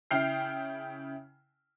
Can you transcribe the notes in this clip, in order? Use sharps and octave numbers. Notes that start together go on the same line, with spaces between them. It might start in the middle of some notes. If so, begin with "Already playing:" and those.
C#3 E4 G5 F6 C7